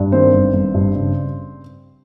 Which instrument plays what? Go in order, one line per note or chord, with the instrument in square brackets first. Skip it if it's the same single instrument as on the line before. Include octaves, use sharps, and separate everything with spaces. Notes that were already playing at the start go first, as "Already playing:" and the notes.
Already playing: [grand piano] G2
D#3 C4 C5
G1
G1
G2
C#3